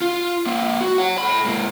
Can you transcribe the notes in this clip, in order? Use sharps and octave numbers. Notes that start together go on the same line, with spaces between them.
F4
A#3 C4
F#4
C#5 F#5
A4 B5
G#2 A#3